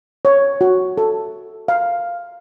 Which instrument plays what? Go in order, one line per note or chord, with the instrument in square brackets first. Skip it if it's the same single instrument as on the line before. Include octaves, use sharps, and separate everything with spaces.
[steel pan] C#5
F#4
A4
F5